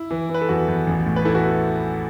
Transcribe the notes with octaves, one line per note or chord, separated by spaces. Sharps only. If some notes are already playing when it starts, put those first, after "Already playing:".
Already playing: E4
E3
E3
B4
A4
E2 F#4
E2
A1
A2
B4
E3 E4 A4
F#4 B4